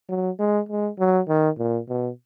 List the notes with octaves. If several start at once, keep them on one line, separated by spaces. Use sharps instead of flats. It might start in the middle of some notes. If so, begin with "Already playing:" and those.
F#3
G#3
G#3
F#3
D#3
A#2
B2